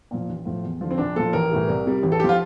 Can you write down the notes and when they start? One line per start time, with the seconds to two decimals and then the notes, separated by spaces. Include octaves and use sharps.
0.11 A#2 F3
0.29 A1
0.46 A2 F3
0.63 E2
0.81 D3 F3
0.91 C4
0.98 A#1 D4
1.15 A#2 F3 A4
1.33 A1 A#4
1.50 A2 E3 G3
1.68 C2
1.86 C3 G3
2.03 A1
2.12 A4
2.20 G4
2.24 F3 F4